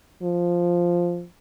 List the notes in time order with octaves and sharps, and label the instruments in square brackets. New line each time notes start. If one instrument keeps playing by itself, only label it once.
[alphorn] F3